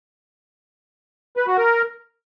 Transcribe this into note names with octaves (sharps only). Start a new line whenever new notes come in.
B4
F#4
A#4